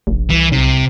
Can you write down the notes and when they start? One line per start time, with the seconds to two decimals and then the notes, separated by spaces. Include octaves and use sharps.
0.07 F1 A#1
0.30 C2 E3
0.52 B1 C3